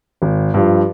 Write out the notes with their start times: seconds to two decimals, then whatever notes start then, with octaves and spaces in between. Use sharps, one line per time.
0.22 G#1
0.54 G2 F3